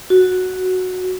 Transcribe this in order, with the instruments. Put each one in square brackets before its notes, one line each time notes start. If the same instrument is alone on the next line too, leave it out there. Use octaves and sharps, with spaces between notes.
[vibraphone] F#4